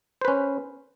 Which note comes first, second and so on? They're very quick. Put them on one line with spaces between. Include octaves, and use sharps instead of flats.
C5 B4 C#4